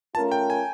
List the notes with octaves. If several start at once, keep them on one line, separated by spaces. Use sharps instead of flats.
A3 C#4 F4 A#4 A5
G5
G#5